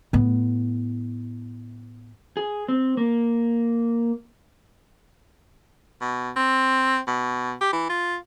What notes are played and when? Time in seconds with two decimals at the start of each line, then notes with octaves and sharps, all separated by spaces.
0.13 A2 B3
2.37 G#4
2.68 C4
2.97 A#3
6.01 B2
6.36 C4
7.08 B2
7.61 G4
7.73 E3
7.89 F4